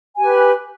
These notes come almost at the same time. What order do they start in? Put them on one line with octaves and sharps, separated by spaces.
G#5 G4 B4